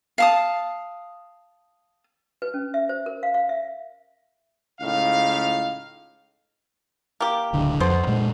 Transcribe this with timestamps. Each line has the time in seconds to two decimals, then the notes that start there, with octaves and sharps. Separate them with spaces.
0.18 F5 A5 D#6
2.42 B4
2.54 C#4
2.74 E5
2.89 C5
3.06 A#4
3.23 F5
3.34 F5
3.49 E5
4.81 C#2 A2 D#4 F5
7.20 A#3 G4
7.53 D1 C#2 D3
7.80 F2 B2 C5
8.07 A#2 G#3